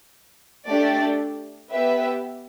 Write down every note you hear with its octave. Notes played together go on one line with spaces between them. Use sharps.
A3 D4 G4 D5
B3 G4 B4 E5